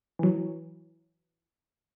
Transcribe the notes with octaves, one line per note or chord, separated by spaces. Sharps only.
E3 F#3